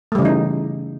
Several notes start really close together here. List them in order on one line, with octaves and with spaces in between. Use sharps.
A3 G3 C#3 E3 D#4